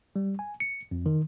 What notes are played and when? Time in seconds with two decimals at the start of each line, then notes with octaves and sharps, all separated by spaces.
0.16 G3
0.39 G#5
0.60 C#7
0.91 F2
1.06 D#3